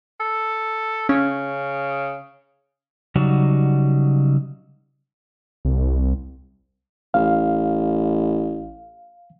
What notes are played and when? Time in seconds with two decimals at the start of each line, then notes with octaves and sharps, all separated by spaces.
0.20 A4
1.09 C#3 C#4
3.15 C#3 F#3 G3 D#4 F#4
5.65 C2
7.14 A1 F5